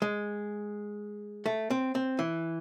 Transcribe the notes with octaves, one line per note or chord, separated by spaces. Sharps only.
G#3
A3
C4
C4
E3